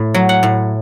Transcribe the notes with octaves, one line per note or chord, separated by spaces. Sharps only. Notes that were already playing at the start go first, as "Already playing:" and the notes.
Already playing: A2
F#3
F#5
A2